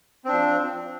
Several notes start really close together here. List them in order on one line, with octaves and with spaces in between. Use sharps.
C4 D4 F3